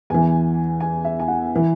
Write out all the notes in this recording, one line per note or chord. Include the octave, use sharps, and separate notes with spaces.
E2 E3 G#5
G#5
E5
G#5
F#5
E3